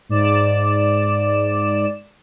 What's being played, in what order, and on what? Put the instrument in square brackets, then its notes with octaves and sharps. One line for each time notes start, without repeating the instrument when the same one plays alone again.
[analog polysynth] G#2 D5 E7